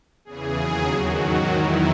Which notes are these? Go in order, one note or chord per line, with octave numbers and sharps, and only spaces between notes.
E2 C#3 E3 G#4
D#2 C#3 F#3
E2 D#3 F#3 F#4
G#2 D#3 F#3 F#4
E2 D#3 F#3 E4